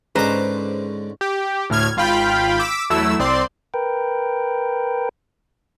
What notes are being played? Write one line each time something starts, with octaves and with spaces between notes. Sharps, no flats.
G#2 D3 G#3 C#4 B4 C5 A#5 D6
G4
D2 A2 F6 G#6
G#1 F4 F5 G5 B5
D6 E6 B6
E2 F#3 A3 E4 E6
C2 C4 D5 C6
A#4 B4 G5